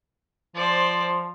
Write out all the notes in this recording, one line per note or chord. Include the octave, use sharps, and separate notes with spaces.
F3 C5 D5